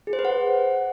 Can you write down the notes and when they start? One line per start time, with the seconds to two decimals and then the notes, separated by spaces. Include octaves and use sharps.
0.07 G#4
0.13 C5
0.19 B4
0.25 F#5